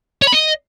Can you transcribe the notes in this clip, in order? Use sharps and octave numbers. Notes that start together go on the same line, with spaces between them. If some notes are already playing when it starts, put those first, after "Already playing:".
C#5
B5
D#5